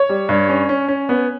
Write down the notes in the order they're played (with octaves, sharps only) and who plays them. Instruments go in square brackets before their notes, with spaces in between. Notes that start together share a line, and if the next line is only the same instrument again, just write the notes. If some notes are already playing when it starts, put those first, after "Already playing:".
Already playing: [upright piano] C#5
[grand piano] G3
G2
C#4
C#4
C#4
B3